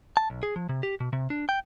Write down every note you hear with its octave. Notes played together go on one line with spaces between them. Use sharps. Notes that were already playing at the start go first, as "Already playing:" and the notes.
A5
B1
G#4
F3
C3
G4
B2
C3
D4
G5